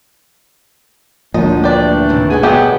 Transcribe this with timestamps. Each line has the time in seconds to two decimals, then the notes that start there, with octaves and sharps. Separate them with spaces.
1.34 D2 A#2 F3 F#3 G#3 D#4 D#5
1.64 E3 A3 D4 G4 D5
2.09 A2 C3 D#3
2.30 G#4 B4 D#5 F#5 G#5
2.43 B2 D3 F#3 B3 G4